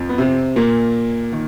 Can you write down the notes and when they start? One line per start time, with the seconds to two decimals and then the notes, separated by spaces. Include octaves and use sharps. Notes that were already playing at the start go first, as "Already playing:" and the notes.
Already playing: F2 F3
0.09 B3
0.18 C3 C4
0.56 A#2 A#3
1.33 D#3